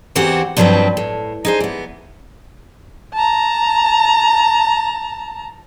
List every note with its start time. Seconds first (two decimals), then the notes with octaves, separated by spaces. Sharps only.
0.15 E2 E3 C4 F#4 G4 F#5
0.57 G2 F3 F#3 C4 B4 G5
0.97 A2
1.45 D#4 G#4 C5
1.60 E3 B3
3.14 A5 A#5